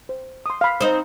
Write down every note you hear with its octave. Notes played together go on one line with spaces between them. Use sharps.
C5
C6 D#6
F5 B5
C4 D#4 C5